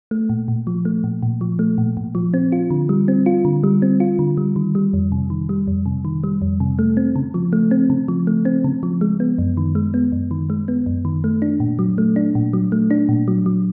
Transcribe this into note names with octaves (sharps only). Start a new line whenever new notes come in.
A3
A#2
A#2
F3
A3
A#2
A#2
F3
A3
A#2
A#2
F3
C4
F4
D3
G3
C4
F4
D3
G3
C4
F4
D3
G3
D#3
G3
F2
C3
D#3
G3
F2
C3
D#3
G3
F2
C3
A3
C4
C#3
F3
A3
C4
C#3
F3
A3
C4
C#3
F3
G#3
B3
F#2
D#3
G#3
B3
F#2
D#3
G#3
B3
F#2
D#3
A3
D4
A#2
F#3
A3
D4
A#2
F#3
A3
D4
A#2
F#3
F#3